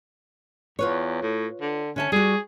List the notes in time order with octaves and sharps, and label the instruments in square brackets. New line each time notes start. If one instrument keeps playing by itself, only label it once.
[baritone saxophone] E2 [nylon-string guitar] F4 B4 C#5
[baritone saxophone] A2
D3
[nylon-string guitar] D3 E5 A5 [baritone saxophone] C#4
[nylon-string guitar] G3 F#4 [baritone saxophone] G#4